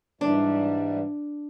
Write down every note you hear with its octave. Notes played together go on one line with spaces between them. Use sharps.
G#2 E3 G3 D4